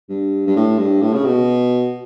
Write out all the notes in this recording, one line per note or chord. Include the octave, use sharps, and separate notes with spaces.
G2
G2
A2
G2
A2
C#3
B2